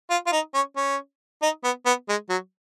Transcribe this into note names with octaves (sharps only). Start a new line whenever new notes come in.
F4
F4
D#4
C#4
C#4
D#4
B3
B3
G#3
F#3